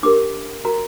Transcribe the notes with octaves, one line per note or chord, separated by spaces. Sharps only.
D4 G4 A#4 D6
F#4 A#4 A#5